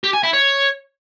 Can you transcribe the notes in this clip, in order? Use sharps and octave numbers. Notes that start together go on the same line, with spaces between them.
G4
G#5
E4
C#5